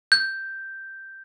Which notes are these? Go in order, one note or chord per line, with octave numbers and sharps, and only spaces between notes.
G6